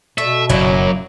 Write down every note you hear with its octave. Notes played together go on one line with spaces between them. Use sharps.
B2 A3 E5
F#1 C2 F#2 F#3 A#3 E4